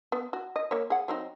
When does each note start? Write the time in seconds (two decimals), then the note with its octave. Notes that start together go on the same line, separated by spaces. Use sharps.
0.12 B3
0.33 F#4
0.56 D#5
0.71 A#3 C#5
0.90 G#4 F#5
1.08 F#3 C4 D#4